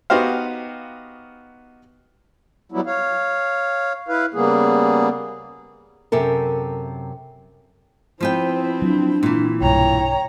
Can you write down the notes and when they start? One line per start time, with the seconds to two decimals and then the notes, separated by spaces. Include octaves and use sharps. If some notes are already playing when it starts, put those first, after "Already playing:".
0.10 B3 D#4 F#4 G4 C5 F5
2.72 F#3 G3 B3 E4
2.86 C#5 F5
4.08 E4 B4 F5
4.34 C#3 G3 A#3 B3 G#4
6.12 F#2 C3 A4 A#4
8.20 F3 B3 C4 E4 C5 G5
8.82 F#3 D4
9.23 A#2 E3
9.61 B1 G2 C#5 G5 A#5